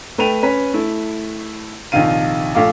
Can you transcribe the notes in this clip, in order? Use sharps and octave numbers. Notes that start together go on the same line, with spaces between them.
A3 B4 G5 D#7 F7
C#4 B4 B6
A3 E4
A#1 C3 D#3 F3 F5 D#7
A#1 A3 F4 F5 D6